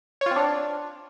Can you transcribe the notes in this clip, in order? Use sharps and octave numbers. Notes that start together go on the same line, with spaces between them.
C#5
F4
C4
D4